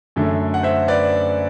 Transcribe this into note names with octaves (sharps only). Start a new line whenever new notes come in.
F#2 D3 A3
F#5
C5 E5
B4 D5